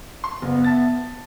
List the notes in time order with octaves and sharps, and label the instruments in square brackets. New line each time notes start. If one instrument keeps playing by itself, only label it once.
[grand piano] C6
[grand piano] F#1 [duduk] B3
[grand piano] E5 A5 A6